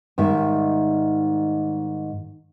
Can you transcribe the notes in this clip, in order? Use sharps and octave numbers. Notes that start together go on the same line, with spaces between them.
G#2 D#3 G3 E5